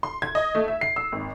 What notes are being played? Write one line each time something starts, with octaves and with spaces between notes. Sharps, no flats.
C6
G#6
D#5
A3
E5
C7
E6
G#1